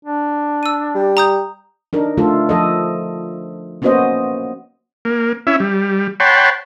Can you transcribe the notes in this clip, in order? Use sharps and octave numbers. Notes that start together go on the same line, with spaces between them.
D4
E6 D#7
G3
A#5 D#6 G6
D4 D#4 A#4
D3 A3 F4 A4
F3 A4 D#5
A#3 B3 C#4 F#4 C5 D#5
A#3
C#4 E4 E5
G3
C#5 F#5 G5 A5 B5 C6